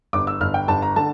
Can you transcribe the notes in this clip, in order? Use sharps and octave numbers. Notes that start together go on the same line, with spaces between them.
G1 D6
E6
G1 F6
G5
G1 A5
A#5
D3 A5